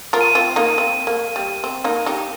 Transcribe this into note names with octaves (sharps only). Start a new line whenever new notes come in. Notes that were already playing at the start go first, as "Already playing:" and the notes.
F4 A#4
D#7
C4 F4
A#3 D#4
C4
A#3
G3
C4
A#3 D#4
D#4 G4